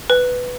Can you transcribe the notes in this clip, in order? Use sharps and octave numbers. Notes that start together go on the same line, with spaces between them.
B4